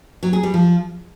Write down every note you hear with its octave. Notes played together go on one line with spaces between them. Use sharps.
F#3
G#4
G3
F3